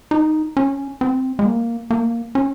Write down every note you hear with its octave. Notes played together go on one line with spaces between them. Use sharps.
D#4
C#4
C4
G#3
A#3
A#3
C#4